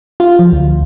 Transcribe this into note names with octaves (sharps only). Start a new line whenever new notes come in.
F4
F3
D2